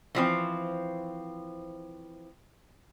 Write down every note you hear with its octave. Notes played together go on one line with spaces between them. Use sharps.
E3 F3 C4